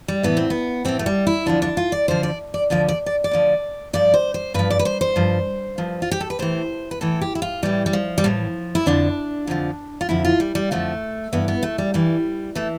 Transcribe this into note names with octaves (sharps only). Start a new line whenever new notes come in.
G3
A2 E3 B3
C4
B3
A2 E3 C4
A3
G3
E4
D2 D3 F3 D4
D4
F4
D5
D2 D3 F3 C5
D5
D5
D2 D3 F3 D5
D5
D5
D5
D2 D3 F3
G2 F3 D5
C5
C5
G2 F3 B4
D5
B4
C5
C5
G2 F3
G2 F3
F4
G4
A4
B4
A2 E3 C5
B4
A2 E3 A4
G4
E4
F4
A2 E3 G3
G3
F3
G3
A2 E3 F3
E4
F2 D3 F3 D4
F2 D3 F3
F4
F2 D3 F3 E4
F4
G3
G3
F2 D3 F3 A3
G2 E3 B3
B3
A3
G3
G2 E3 G3
E3 A3